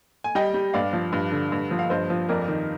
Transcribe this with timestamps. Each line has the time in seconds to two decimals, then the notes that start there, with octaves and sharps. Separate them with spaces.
0.24 G#5
0.35 G3 D#5 G5
0.54 G3
0.74 G2 D5 F5
0.93 F3
1.12 G2
1.32 D3
1.52 G2
1.71 F3
1.79 F5
1.90 G2 C5 D#5
2.10 F3
2.29 F2 A#4 D5
2.48 D#3